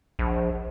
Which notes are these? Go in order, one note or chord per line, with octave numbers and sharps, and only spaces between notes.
A#1